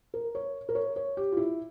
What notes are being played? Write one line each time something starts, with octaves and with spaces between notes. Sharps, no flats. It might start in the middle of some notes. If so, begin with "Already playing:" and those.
A#4
C#5
A#4
C#5
C#5
G4
F4
E4